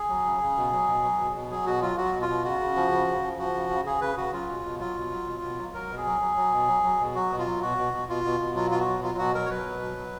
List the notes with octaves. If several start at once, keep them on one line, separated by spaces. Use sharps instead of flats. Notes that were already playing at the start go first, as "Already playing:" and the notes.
Already playing: G#4
F#3
C#3
C#3
B2
F#3
B2
F#3
B2
B2
F#3 G#4
B2 F#4
F#3 F4
F#3 F#4
B2
F4
B2
C#3 F#4
C#3
F3
C#3
C#3
F3
F3 F#4
C#3
C#3
C#3 G#4
C#3 B4
C#3 F#4
F#3 F4
B2
B2
F#3 F4
B2
F#3
B2
B2
F#3
F#3 A#4
B2
G#4
F#3
F#3
F#3
B2
F#3
F#3
B2
F#3 F#4
B2
F4
F#3
B2 F#4
B2
B2
B2 F4
B2
B2
F#3 F4
B2 F4
F#4
F#3
F#3 F4
B2 F#4
F#3 A#4
C#5
F#3 B4
B2
F#3
F#3